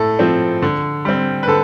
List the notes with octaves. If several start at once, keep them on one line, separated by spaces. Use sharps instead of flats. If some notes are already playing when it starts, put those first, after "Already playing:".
Already playing: A2 A4
F3 C4
D3
G3 C4
B4
D3 A4